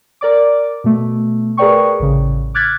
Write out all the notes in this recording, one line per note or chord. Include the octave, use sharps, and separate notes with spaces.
A#4 D5 D6
B2 A3
G#4 A#4 B4 D5 G5 C#6
A1 C#3
D6 F6 F#6 G#6 A6 B6